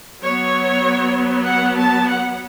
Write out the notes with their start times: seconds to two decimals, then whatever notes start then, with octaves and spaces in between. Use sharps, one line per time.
0.21 F#3 B3 C#5
1.46 F#5
1.77 A5
2.08 F#5